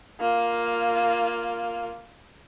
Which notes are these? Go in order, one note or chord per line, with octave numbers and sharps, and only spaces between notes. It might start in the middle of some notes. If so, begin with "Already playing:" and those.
A#3 F4